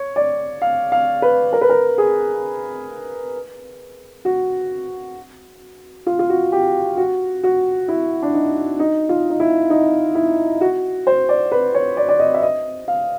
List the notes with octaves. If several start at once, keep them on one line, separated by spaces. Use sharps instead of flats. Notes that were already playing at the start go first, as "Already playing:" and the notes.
Already playing: C#5
D5
F5
F5
B4
A#4
B4
A#4
G#4
F#4
F4
F4
F#4
G4
F#4
F#4
E4
D4
D#4
D#4
F4
D#4
E4
D#4
E4
F#4
C5
D5
B4
C#5
D5
D5
D#5
E5
D#5
F5